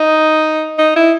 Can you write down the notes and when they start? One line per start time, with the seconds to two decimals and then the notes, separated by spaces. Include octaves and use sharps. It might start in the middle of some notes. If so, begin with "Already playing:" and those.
Already playing: D#4
0.78 D#4
0.96 E4